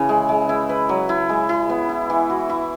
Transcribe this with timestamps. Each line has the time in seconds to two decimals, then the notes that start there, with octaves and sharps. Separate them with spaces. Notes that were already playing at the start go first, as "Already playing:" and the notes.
Already playing: C#3 E3 E4
0.09 G#3
0.29 G#3
0.49 E4
0.69 B4
0.89 F#3
1.09 E4
1.29 G#3
1.49 E4
1.69 B3
1.89 E4
2.10 E3
2.30 F#4
2.49 E4